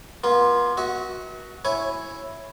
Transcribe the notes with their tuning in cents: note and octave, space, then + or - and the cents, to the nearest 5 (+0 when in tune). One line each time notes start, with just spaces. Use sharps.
B3 -45 F4 +0
F#4 +0 E5 -45
E4 +0 C#5 -5 G#5 +0